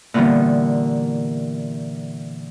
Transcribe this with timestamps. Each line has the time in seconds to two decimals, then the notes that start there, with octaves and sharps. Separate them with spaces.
0.14 A#2 D3 E3 G3 B3